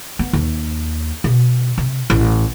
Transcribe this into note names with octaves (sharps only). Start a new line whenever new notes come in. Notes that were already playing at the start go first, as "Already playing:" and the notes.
B3
D#2
B2
C3
A1